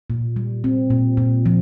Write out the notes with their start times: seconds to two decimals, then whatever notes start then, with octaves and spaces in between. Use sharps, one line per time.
0.10 A#2
0.36 G3
0.64 C4
0.90 A#2
1.17 A#2
1.46 F3